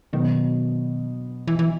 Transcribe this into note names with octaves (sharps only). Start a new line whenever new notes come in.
B2 D#3 F#3 B3
E3
E3